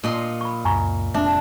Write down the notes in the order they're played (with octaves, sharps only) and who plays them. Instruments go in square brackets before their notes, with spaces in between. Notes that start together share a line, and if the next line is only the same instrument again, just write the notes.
[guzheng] A#2 D#5 C6
[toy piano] B5 C#6
[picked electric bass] C#2 F#2 [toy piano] G#5 A#5 C#6
[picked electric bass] F1 G#3 C4 [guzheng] D4 [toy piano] E5